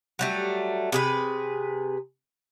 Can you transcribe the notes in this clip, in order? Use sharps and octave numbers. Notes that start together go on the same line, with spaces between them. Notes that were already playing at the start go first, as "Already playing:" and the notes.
F#3 G3 A3
C3 G#4 B4